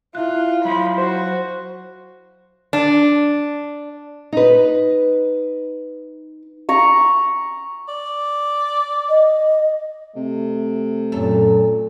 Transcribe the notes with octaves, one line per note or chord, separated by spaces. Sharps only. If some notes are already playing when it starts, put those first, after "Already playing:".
E4 F4 E5 F#6
F#3 F5 B5 C6
F#4 C5
D4
D#4 B4
A#5 C#6
D5
D#5
C3 A3
F#2 A#2 F#3 A4